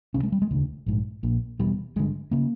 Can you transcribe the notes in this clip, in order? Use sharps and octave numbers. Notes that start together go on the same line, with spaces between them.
D2 C3 C#4
G#3
G3
G#3
E1 D2 C#3
A#1 G#2
A#1 A#2
E1 E2 B2 G3
G1 G2 D3 G#3
C#3 A#3